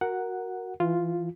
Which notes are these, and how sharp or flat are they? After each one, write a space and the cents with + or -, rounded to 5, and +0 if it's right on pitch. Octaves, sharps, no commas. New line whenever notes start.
F#4 +0 A#4 +0 F#5 +0
E3 +15 F4 +0